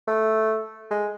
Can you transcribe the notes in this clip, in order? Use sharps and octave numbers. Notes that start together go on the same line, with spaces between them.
A3
G#3